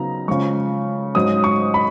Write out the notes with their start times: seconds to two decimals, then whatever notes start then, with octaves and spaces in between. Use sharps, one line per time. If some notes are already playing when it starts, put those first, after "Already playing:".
Already playing: C#3 F#3 B3 D#4 A#5
0.28 C#3 F3 G#3 C#6
1.15 G#2 F#3 C#4 D#6
1.44 C#6
1.74 B5